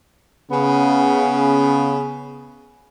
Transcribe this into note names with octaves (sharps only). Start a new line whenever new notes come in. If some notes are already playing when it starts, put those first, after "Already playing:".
C#3 B3